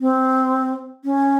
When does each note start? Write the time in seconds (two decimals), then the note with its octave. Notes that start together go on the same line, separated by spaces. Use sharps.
0.01 C4
1.05 C#4